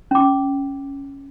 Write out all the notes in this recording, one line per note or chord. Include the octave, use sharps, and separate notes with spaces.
C#4 D6